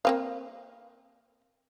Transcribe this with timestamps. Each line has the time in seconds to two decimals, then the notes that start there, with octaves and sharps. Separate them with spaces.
0.05 A#3 C4 F5